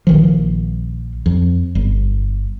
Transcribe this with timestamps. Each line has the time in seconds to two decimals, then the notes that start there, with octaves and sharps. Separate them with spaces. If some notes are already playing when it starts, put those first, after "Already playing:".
0.07 A#1 D#3 F3
1.26 F2
1.75 G1